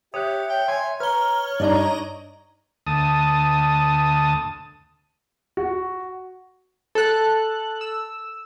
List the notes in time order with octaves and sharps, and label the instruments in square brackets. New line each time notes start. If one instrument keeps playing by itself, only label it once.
[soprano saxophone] G4 [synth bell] C#5 [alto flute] E5 [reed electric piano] D#6 F#6
[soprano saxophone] G5
[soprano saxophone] G#5 [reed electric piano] C6
[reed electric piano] B4 [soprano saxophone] C#5 [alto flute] A#5 [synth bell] F6 G7
[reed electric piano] G2 D4 [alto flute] D#4 [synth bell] D5 D#5 A#5
[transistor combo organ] D2 A5 D#6
[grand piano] F#4
[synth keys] A4 F#6
E6